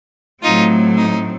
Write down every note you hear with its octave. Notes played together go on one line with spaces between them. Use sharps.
A2 F#3 A3 C4 D#4 F4
D#4